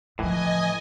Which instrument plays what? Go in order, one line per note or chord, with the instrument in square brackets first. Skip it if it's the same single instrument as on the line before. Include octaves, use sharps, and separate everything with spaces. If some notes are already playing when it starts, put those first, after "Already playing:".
[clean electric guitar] A2 E3 [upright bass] D3 F3 [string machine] D#5 G#5